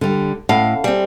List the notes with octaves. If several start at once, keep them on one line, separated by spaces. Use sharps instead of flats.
D3 G3
A2 C#4 F5 F#5 A5
G3 C4 G#4